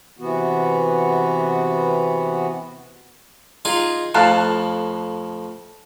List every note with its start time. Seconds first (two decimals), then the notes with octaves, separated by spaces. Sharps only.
0.19 C3 E3 B3 F#4
3.65 D#4 F4 G#4
4.15 F2 A2 F5 A5 F#6